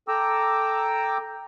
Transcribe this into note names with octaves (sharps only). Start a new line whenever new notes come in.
A4 G5 A#5 D6 E6